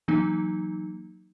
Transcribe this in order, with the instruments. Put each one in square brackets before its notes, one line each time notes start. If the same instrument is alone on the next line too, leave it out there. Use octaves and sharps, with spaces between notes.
[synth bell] E3 F#3 A#3 D#4